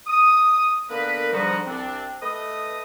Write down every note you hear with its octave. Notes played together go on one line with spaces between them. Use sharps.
D#6
D3 A#3 B3 A#4 B4
G#2 D3 F3 G3 D#4 F#4
C2 C4 D4
A3 B4 D#5 D#6